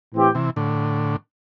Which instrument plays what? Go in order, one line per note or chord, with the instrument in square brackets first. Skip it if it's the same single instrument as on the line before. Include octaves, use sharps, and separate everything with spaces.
[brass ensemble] A2 E3 C4 G4
[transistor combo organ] C3 E3
A2 D3